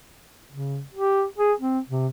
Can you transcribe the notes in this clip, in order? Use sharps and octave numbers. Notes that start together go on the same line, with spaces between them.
C#3
G4
G#4
C4
C3